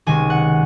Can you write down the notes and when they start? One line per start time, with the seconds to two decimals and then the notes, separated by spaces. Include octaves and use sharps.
0.06 C#2 C3 D#3 G#5
0.30 F#5